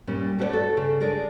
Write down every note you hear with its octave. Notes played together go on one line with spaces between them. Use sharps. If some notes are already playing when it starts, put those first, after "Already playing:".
A#2 G3 C#4
A3 F#4 G4 B4 C#5 D5
F#4 A4
C#3
D4 G#4 A#4 C#5 D5